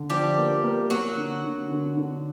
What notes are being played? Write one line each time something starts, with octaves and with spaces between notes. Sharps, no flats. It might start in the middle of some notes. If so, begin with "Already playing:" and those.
Already playing: D3
F3 G3 G4
A#3
A#3
F#3 A#3 F#4
D3
D3
D3
D3